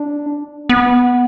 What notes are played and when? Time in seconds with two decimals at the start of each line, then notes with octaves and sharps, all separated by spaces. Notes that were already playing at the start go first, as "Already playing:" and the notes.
Already playing: D4
0.69 B3